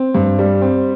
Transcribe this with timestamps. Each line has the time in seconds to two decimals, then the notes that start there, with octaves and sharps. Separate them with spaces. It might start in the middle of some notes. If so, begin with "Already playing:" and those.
Already playing: C4
0.15 G2
0.39 G3
0.62 C4